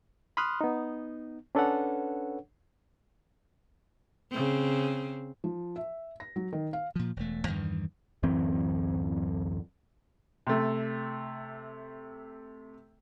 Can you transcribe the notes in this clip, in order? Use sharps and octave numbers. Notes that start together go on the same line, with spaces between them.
B5 C6 D#6 F6 F#6
B3 D#4
C#4 D4 A4 B4 C#5 F#5
C#3 C4
F3
E5
A#6
F#3
D#3
F5
A#2 F3
E1 A3
E2 G2 D#3 E3
D1 F#2 E3 C4
C3 A3